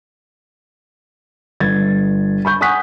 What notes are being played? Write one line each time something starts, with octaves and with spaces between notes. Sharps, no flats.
G1 G#6 A6
B5 C#6 G6
F#5 G#5 C#6 D#6 F#6 B6